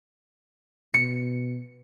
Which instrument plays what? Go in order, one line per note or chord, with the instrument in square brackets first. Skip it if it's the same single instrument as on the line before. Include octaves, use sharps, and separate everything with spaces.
[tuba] B2 [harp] C#7